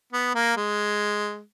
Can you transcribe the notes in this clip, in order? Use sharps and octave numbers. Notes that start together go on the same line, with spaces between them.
B3
A#3
G#3